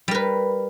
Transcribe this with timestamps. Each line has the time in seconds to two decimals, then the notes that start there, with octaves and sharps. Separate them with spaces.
0.08 G3
0.11 A#4
0.15 B4